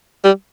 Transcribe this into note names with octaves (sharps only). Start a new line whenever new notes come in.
G3